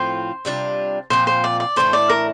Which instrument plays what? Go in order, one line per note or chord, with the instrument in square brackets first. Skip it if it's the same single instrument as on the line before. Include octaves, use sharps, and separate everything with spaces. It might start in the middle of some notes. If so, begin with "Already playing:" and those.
Already playing: [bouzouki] A2 F3 C4 F4 [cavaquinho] C5
[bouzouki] C3 G3 D4 F4
[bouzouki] A#2 F3 C4 F4 [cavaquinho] C5
[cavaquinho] C5
D5
D5
[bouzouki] A2 E3 A3 D4 [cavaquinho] C5
[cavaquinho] D5
A#4